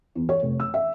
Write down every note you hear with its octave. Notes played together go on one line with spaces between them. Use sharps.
E2
C#5
F1
E6
E5